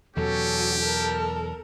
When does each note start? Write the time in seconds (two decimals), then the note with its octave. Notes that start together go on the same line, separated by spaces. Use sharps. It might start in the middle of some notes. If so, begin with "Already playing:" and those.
0.17 E2 B2 F#3 C#4 F#4 G4 A4
0.80 A4 A#4 A5